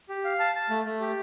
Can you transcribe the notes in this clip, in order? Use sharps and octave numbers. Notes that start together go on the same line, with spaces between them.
G4
F5
A5
A5
A3
A3
G4